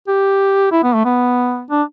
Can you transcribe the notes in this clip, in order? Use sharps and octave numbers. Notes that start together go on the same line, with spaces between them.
G4
E4
B3
A3
B3
D4